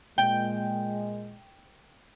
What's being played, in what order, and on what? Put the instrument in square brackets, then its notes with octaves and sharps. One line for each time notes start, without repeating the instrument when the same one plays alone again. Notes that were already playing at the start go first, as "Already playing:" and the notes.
[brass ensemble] A#2 G#3 [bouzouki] G5